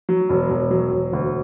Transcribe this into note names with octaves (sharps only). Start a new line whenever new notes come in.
F#3
E1
E1
F#3
E1
D2